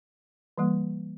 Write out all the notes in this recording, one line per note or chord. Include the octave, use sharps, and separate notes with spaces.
E3 G3 A#3